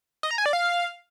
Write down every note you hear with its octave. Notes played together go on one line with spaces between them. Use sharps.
D#5
A#5
G#5
D5
F5